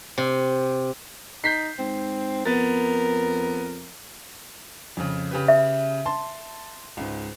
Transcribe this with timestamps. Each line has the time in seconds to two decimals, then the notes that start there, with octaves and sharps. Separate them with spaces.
0.18 C3
1.44 D#4 G6 B6 C7
1.79 G#2 C4
2.45 F2 B3 A#4 A6
4.97 F2 C#3
5.31 C#3 G4 B4
5.48 E5
6.06 A5 C6
6.97 C#2 G#2